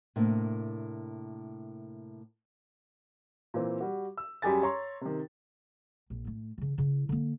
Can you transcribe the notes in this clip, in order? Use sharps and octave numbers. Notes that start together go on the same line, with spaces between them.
A2 C3 A#3 D4
A#2 E3 C4
G3 F#4
E6
F#2 G3 G4 G#4 G#5 A6
C#5 A#5 C6
C3 D#3
A#1
A2 A3
C#3 E3
C#3 E4
D3 A#3